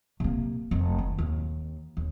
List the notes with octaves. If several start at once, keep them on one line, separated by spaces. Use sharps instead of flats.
C3 A#3
F1
D#3
D#2
D#2